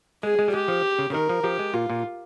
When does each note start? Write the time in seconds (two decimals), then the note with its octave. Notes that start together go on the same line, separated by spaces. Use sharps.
0.23 G#3 G#4
0.39 G#3
0.48 G3
0.54 G#3 G4
0.68 F3
0.99 C#3
1.10 C#3
1.14 D#3 A#4
1.29 F3
1.43 F3 G4
1.59 G#3
1.74 A#2 F4
1.90 A#2